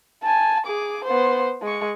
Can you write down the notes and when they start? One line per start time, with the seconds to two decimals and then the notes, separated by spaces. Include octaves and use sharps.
0.24 G#5 A5
0.66 G#4 D6
1.04 B3 C5
1.62 G#3 C#6